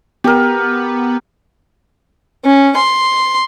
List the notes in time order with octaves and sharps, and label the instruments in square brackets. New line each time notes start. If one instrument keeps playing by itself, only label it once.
[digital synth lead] B3 [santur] G4 A#4
[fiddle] C#4
C6